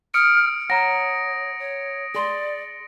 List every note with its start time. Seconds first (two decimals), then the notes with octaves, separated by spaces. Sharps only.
0.14 D#6 F6 C#7 D7
0.70 C#5 F#5 A#5 A#6 D7
1.59 C#5
2.15 G#4 D5 C6